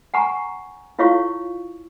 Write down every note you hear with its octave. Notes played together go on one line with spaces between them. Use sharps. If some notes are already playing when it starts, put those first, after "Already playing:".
F#5 G#5 A#5 C#6
E4 F4 C#5 F5 C#6